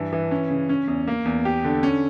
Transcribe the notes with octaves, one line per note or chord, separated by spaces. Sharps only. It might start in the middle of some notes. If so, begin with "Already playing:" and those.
Already playing: G2 E3
E3
C#4
C#3
C#4
E2
A#3
E2
G4
D3
C#4